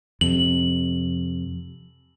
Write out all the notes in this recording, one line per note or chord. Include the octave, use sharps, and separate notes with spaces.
F2 C3 F#7